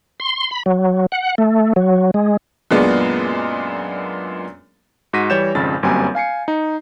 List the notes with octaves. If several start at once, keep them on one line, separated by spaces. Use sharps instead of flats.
C6
B5
F#3
F#5
A3
F#3
G#3
F#2 A#2 G#3 B3 D4
G#2 F#4 A#6 B6 D#7
E3 G3 C#5 G6 A6 E7
G#1 F2 C#3 A6
G1 F#2 G3 A#3 C4 G#5
F5 G#5 C7 C#7
D#4